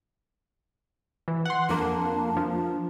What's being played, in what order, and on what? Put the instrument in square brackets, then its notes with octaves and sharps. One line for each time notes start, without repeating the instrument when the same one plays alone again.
[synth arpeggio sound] E3
F#5 C6
[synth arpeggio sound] F2 A#3 [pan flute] D4
[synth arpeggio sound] F3